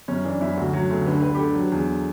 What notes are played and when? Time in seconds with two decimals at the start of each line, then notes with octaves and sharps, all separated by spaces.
0.08 F#2 C#4
0.25 E3 D4
0.41 F#2 E4
0.57 D2 F#4
0.73 F#3
0.90 D2 A4
1.06 D3 B4
1.17 A4
1.22 D3 B4
1.35 G4
1.39 D3 A4
1.55 F#3
1.72 E2